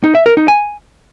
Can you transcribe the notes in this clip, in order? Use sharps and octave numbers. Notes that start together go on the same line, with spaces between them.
D#4
E5
A#4
D#4
G#5